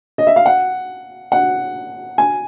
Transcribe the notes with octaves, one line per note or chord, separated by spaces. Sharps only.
D#5
E5
F5
F#5
F#5
G#5